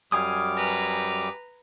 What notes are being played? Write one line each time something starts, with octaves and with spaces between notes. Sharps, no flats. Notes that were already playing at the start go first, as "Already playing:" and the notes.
F#2 G3 F5 G#5 D6 D#6
B4 A#5